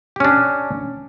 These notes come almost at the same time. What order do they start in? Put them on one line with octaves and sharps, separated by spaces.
G4 C#4 D4